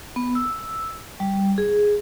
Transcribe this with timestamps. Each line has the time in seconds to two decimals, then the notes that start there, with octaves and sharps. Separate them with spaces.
0.16 B3
0.35 E6
1.20 G3
1.58 G#4